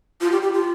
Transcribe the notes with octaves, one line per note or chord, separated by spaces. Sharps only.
F4
G4
G4
F4